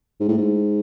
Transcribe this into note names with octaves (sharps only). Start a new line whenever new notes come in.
G#2
A2
G#2